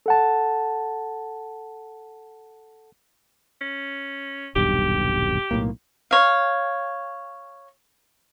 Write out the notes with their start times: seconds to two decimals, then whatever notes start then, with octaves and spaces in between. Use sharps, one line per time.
0.06 A4 F#5 A5
3.61 C#4
4.56 D#1 B1 G2 G4
5.51 B1 A2 A#3
6.11 C#5 F5